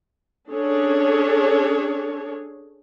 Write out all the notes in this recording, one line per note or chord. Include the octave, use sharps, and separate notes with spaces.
C#4 D4 G#4 A4 C#5